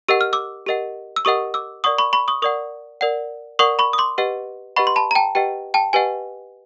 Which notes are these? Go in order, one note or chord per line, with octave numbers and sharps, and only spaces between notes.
G4 A#4 D#5 F#5 E6
F6
D6 E6
G4 A#4 D#5 F#5
E6
G4 A#4 D#5 F#5 C#6 D#6
D6 E6
A#4 D5 F#5 C#6 D#6
B5 C#6
B5 C#6
C#6 D#6
A#4 D5 F#5 C#6 D#6
A#4 D5 F#5
A#4 D5 F#5 C#6 D#6
B5 C#6
D#6
C6 D6
G4 B4 D#5 F#5
G4 B4 D#5 F#5 B5 C#6
C6
A5 B5
A#5
G5 A5
G4 B4 D#5 F#5 G5
G5 A5
G4 B4 D#5 F#5 G#5